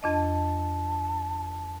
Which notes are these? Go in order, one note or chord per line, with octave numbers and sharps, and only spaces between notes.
F2 D4 D#5 A5